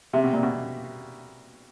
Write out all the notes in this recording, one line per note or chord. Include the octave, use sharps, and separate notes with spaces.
C3
B2
A#2
B2